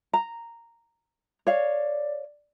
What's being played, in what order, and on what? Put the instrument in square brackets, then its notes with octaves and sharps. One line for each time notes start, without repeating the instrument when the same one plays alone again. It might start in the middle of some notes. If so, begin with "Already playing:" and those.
[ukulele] A#5
[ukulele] C#5 F5 [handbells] D5